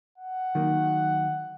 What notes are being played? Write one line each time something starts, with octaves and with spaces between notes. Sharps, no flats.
F#5
D#3 F#3 A#3